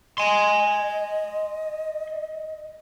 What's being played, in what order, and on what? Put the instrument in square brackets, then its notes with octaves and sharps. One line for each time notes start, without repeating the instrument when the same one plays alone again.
[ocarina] D#5 [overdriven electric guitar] G#5 C6